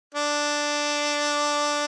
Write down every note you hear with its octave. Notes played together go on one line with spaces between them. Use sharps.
D4